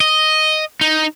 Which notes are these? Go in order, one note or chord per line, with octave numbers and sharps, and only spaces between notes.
D#5
D#4